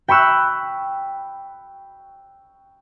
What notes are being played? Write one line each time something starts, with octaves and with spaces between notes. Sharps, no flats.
G5 B5 C#6 E6 F#6